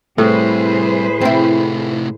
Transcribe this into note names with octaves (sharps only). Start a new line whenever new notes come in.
A2 G3 C4 G#4 B4 C5
C3 A3 C4 E4